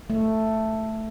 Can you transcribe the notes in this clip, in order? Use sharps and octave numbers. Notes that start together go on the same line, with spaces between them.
A3